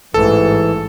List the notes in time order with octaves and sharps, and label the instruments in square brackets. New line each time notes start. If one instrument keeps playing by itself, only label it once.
[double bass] A1 G#2 [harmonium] E3 [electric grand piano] A4